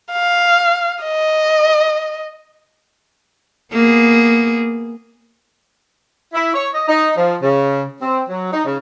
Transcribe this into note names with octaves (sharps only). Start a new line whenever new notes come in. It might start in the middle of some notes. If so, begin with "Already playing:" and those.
F5
D#5
A#3 B3 G#4
E4
C#5
D#5
D#4
F3
C#3
C4
F#3
D#4
C#3